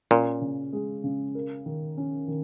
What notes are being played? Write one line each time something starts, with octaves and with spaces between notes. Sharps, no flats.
A#2 C#4
C#3
G#3
C#3
A#4
D#3
C#4
D#3